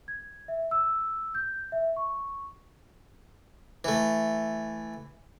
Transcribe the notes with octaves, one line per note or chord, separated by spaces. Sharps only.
G#6
E5
E6
G6
E5
C#6
E3 A3